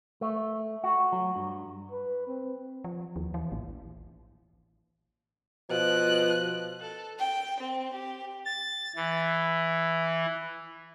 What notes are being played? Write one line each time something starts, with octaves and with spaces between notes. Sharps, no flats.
A3
F#4
F#3
G2
B4
C4
F3
D#2
E3
A1
B2 F3 F#6
A4
G5
C4
G4
A6
E3